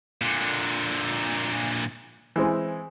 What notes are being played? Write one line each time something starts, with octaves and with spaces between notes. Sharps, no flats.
A#2 D3
E3 G#3 C4